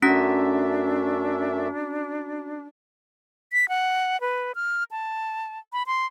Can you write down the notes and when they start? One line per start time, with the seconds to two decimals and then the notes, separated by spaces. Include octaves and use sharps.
0.02 F#2 A3 C#4 D4 F#4 E5 A#5 B6
3.52 B6
3.69 F#5
4.21 B4
4.55 F6
4.91 A5
5.73 B5
5.87 C6